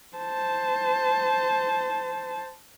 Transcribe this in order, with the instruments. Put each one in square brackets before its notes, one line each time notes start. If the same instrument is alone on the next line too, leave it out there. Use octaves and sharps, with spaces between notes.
[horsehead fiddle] C5 A5